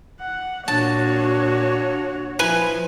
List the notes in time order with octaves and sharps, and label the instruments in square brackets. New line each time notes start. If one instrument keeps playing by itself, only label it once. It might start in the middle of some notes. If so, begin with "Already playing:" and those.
[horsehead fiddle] F#5
[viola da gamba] A#2 [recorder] D4 [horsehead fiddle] F#4 C#5 [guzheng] A5
[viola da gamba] F3 [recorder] E4 [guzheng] B4 G#5